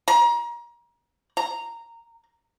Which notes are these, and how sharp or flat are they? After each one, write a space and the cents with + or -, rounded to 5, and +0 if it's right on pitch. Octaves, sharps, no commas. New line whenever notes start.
A#5 +30
A#5 -10